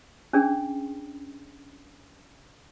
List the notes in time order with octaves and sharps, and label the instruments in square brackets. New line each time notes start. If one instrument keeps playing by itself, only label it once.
[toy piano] C#4 D4 G#4